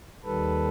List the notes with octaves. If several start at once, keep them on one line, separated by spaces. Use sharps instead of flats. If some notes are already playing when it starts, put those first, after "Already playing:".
D#2 D#3 G3 A4 B4